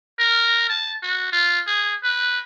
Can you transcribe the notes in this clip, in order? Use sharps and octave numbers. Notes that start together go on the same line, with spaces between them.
A#4
A5
F#4
F4
G#4
B4